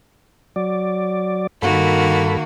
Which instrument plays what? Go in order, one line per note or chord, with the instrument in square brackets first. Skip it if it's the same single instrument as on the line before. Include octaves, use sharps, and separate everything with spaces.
[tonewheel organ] F#3 D5
[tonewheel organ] G2 A4 B5 [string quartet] D#3 A#3 F#4